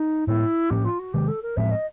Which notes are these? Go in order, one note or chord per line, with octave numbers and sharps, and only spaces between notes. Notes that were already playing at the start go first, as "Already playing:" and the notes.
Already playing: D#4
A2 F3 G#3 B3 E4
A2 F3 A#3 C#4 G4
F4
F#4
C3 D#3 G#3 G4
A4
A#4
A2 F3 G#3 C4 E5
D#5